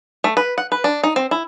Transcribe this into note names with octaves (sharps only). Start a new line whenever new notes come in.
A3
B4
F#5
B4
D4
D#4
C4
E4